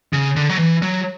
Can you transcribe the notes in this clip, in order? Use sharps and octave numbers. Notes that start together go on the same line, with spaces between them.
C#3
D3
F#3
E3
F#3